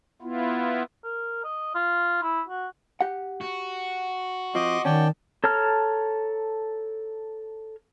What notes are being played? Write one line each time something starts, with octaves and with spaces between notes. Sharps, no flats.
B3 E4 F4
A#4
D#5
F4
E4
F#4
G4 F#5
F#4
F2 F3 D#5 C6 D6
D#3 C#4 D5 G5 A5
A4 C#5 A5 A#5 F6